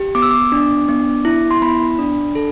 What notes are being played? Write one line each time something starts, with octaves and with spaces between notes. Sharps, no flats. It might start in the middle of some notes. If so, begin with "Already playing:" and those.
Already playing: G4
B3 D6
E6
D6
D4
B3
E4
C6
B3 B5
D4
A4